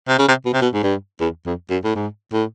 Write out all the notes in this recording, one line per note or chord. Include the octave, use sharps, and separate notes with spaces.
C3
C#3
C3
B2
C3
B2
G#2
G2
E2
F2
F#2
A2
G#2
A2